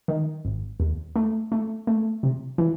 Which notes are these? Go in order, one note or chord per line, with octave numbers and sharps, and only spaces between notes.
D#3
G#1
D#2
A3
A3
A3
C3
E3